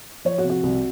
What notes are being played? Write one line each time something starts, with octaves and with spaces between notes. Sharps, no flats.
F3 C#5
F#4
C3
F#4
C2